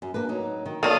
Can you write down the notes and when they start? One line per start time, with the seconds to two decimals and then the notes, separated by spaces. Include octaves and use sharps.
0.02 F#2
0.14 A#3 D4 B4
0.29 F#3 D#4
0.66 D#3
0.83 D#3 F#3 A#3 A4 D5 F5 D#6